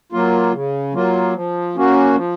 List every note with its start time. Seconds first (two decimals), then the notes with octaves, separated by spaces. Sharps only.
0.12 F#3 A#3 F4
0.53 C#3
0.93 F#3 A#3 F4
1.35 F3
1.75 A#3 C#4 F#4
2.16 F3